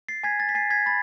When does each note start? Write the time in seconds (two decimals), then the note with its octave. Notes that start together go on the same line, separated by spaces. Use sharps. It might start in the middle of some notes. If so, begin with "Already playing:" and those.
0.08 A6 C7
0.23 G#5 G#6 B6
0.40 A6
0.49 B6
0.55 G#5 A6 C7
0.70 G#6 B6
0.86 B5 A6